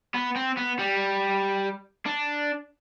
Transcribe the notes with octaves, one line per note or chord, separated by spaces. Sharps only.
B3
C4
B3
G3
D4